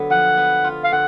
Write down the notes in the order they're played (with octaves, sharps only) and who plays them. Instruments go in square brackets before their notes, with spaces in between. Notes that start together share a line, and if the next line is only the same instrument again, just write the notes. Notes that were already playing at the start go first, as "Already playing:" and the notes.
Already playing: [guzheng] D3 F#3 B3
[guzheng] F3 [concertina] F#5
[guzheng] B3
F4
[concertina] F5
[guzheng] D3 [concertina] F#5